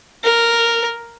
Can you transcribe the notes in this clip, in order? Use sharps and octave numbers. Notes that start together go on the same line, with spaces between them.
A#4